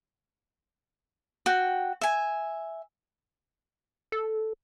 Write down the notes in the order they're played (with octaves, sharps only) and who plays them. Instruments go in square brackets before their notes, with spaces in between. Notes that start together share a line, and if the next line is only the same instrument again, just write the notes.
[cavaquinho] F#4 G5
E5 G#5
[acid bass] A4